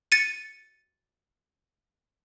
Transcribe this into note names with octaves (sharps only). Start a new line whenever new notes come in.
A6 C#7 D#7